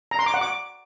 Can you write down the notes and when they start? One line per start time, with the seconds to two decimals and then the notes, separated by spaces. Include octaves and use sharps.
0.11 A#5
0.19 C6
0.26 D6
0.34 F#5
0.41 D6